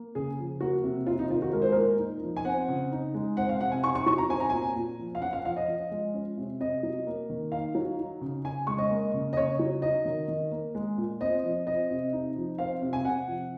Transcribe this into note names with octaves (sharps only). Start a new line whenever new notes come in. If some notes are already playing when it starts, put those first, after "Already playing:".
Already playing: A#3
C#3 G#4
F3
A#3 F#4
C3
D#4 F4
D#4
D#3 F4
F#4
G#3 A#4
C5
A#2 A#4
D#4
F3
G#5
C4 F#5
C#3
D#4
G#3
C4 F#5
F5
C3 F#5
G#5
D#4 C#6
C#6
F#3 C#6
A#5
C4 G#5
A#5
A#2 G#5
A#2
F3
F5
C#4 F#5
F5
F3 F5
D#5
F3
G#3
C#4
C3
C3 D#5
F#3
A#3
D#3
D#4 F5
F#3
D#4
C#3
C#3 G#5
G#3 C#6
D#5
A#3
C#3
D#5
C#3 C#5
F#3
D#4 D#5
D#3
D#3
A#3
G#3
A#2
C4 D#5
F3
C4 D#5
C3
D#4
F3
C4 F5
C3
G#5
C3 F#5
F3